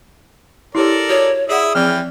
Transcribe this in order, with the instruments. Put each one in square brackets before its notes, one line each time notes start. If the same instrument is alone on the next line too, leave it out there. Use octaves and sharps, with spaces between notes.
[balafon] E4 G4 C#5 [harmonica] A4 A#4 D5
[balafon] F#4 [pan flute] C#5
[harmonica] E4 E5 D#6 [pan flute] G#4 [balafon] D5 F#5
[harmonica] E3 G5 F6 [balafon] F3 C4 D5